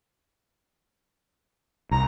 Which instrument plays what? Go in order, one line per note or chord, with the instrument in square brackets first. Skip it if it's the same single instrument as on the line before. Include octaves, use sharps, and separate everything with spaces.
[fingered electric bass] C2 [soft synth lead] A#5